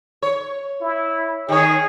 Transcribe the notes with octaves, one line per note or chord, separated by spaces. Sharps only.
C#5
E4
D#3 G#4 C#5